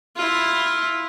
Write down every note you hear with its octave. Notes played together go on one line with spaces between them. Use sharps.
E4 F4